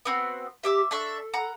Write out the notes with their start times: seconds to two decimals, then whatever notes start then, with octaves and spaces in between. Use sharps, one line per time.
0.05 B3 C4 F#4
0.63 G4 E5 D6 E6
0.91 D4 A4 E5 C#6
1.34 F#5 A#5